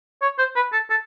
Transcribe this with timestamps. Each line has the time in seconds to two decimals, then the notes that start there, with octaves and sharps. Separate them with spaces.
0.22 C#5
0.39 C5
0.56 B4
0.73 A4
0.90 A4